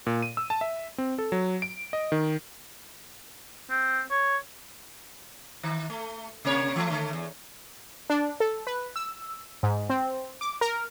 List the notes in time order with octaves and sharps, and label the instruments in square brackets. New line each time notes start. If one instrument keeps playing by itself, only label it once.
[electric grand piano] A#2
D#7
E6
A5
E5
C4
A4
F#3
D7
D#5
D#3
[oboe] C4
C#5
[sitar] D#3
A3
C3 A#3 C#5
E3 A3
D3 A3
E2
[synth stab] D4
A4
B4
E6
G#2
C4
D6
A#4